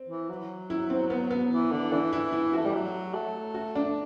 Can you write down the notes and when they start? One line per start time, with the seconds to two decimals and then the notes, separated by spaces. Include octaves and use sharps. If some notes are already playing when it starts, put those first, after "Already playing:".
Already playing: C4
0.09 E3
0.29 F#3
0.70 E4
0.90 C4
1.10 B3
1.31 B3
1.51 E3
1.72 D3
1.92 E3 D4
2.13 E4
2.33 E4
2.53 A3 F#4
2.66 G3
2.74 F#3
3.14 A3
3.54 F#4
3.75 D4